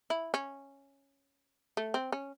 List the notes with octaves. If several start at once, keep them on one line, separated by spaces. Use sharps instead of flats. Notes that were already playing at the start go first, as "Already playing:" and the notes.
E4
C#4
A3
C4
C#4